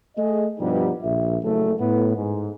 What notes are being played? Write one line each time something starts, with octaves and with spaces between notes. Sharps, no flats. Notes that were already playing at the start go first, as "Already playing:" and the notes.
A3 G#4 D#5
G2 B2 F3 G3 B3 D#4
A#1 E5
F#1 A3 A4
A2 B3
G#2